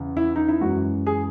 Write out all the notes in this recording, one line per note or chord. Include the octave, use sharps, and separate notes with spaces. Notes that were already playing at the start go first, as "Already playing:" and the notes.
Already playing: E2 C#3
E4
D#4
E4
F#2 E3 G#3 F#4
G#4